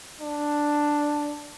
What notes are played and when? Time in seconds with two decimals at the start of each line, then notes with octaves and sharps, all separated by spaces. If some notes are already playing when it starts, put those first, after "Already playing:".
0.21 D4